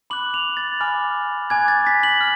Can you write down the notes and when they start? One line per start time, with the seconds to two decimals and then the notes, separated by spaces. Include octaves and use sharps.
0.10 B5 D6 F#6 F#7
0.34 F7
0.57 A6
0.80 G#5 B5 D6 F6
1.50 G#5 D6 F#6 G#6
1.68 A6
1.87 B6
2.03 F#7
2.21 F6